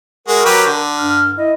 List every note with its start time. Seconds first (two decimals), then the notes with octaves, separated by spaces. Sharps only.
0.28 G#3 F#4 A#4
0.45 F#3 G4 B4
0.66 D3
0.98 G2 F6
1.38 E4 D#5